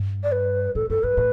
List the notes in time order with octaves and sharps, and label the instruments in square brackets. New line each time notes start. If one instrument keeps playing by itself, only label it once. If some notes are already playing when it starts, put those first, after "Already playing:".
Already playing: [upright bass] G2
[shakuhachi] D5
B4
[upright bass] A2 [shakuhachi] A4
[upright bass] G2 [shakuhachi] A4
[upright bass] G2 [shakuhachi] B4
[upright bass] A2